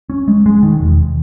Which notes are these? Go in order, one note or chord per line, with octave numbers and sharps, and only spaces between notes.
C#4
G#3
G#3
D#3
E1